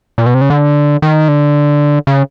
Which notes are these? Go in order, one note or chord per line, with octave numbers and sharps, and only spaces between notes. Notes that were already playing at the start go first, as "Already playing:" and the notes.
A#2
B2
C3
C#3
D3
D#3
D3
C#3